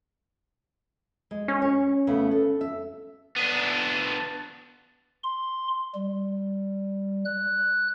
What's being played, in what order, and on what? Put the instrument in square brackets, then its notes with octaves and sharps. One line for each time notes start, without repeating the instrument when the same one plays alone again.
[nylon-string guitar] G#3
[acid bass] C#4
[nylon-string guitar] C#5
C#3 A3 B3
A4
E5
[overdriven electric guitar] B3 D4
[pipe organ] C6
G3
F#6